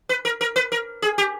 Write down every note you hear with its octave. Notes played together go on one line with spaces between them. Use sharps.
B4
A#4
A#4
B4
A#4
G#4
G4